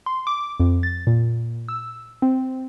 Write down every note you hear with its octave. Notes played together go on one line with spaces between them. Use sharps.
C6
D6
F2
A6
A#2
E6
C4